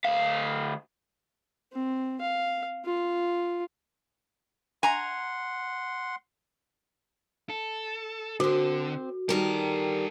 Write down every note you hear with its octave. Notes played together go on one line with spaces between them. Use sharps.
D2 F5
C4
F5
F4
F#5 G#5 A#5 C6
A4
D3 C4 F#4 C5
D#3 G3 G4 A4 A#4